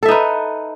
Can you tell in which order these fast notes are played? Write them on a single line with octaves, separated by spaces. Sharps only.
A4 E5 D#4 B4